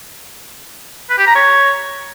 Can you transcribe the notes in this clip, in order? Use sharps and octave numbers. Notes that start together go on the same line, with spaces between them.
B4
G4
A#5
C#5